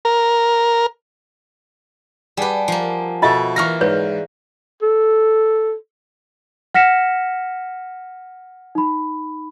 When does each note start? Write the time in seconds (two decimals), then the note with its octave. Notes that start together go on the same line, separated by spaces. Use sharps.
0.05 A#4
2.37 G3 G4 G#4 B4 F#5 G#5 A5
2.68 F3 A#3
3.22 B2 F4 A4 D#5 E5 B5
3.56 E3 A#3 F#4 C#6 F6 A#6
3.81 G#2 G#4 B4 C#5 D5
4.82 A4
6.74 F#5 F6 A#6 B6 C#7 E7
8.75 D#4 B5